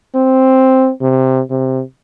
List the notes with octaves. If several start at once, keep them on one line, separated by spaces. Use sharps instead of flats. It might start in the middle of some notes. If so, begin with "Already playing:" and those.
C4
C3
C3